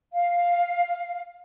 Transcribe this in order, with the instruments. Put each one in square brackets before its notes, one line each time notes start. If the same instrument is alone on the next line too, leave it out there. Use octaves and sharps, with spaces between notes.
[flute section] F5